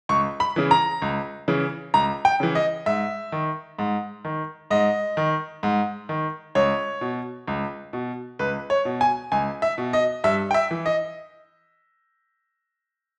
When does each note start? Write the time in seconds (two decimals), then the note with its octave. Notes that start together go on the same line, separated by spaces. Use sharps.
0.09 C#2 C#6
0.40 B5
0.56 C#3 E3
0.71 A#5
1.02 C#2
1.48 C#3 E3
1.94 C#2 A#5
2.25 G5
2.40 C#3 E3
2.55 D#5
2.86 G#2 E5
3.32 D#3
3.79 G#2
4.25 D#3
4.71 G#2 D#5
5.17 D#3
5.63 G#2
6.09 D#3
6.55 C#2 C#5
7.01 B2
7.48 C#2
7.93 B2
8.39 C#2 B4
8.70 C#5
8.85 B2
9.01 G#5
9.32 C#2 G#5
9.62 E5
9.78 B2
9.93 D#5
10.24 G2 E5
10.51 G5
10.54 E5
10.71 E3
10.86 D#5